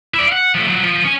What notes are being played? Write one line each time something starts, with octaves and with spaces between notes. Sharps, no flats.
E4 D5
F5 F#5
F3 A3
F3 F#3
F3
C#4 G#5